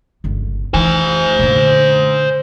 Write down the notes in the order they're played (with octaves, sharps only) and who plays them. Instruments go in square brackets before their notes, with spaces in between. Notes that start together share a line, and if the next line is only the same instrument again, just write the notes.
[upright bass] G1 C#2
[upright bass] E3 [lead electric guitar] C5 G#5
[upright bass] A#2 D3